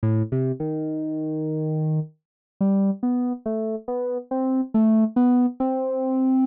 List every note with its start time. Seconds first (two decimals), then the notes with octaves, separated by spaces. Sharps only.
0.03 A2
0.32 C3
0.60 D#3
2.61 G3
3.03 B3
3.46 A3
3.88 B3
4.31 C4
4.74 A3
5.16 B3
5.60 C4